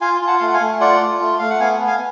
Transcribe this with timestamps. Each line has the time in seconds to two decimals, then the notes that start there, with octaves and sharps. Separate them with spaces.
0.01 F4 F5 G#5
0.21 F4
0.27 F#5 A5
0.39 A3 F5
0.47 F#5
0.54 F5 G#5
0.61 A3
0.80 F4 D5 F#5
1.00 F4
1.20 A3
1.39 A3 F5
1.50 F#5
1.60 B3 F5 G#5
1.81 B3
1.87 F5 G#5